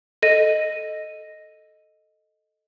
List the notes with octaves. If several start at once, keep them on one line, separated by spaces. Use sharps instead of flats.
A4 D#5 A#6 D#7